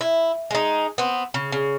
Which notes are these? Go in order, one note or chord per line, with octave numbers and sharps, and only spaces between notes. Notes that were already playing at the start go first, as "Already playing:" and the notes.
E4
G#3 D#4
B3 C4
C#3
C#3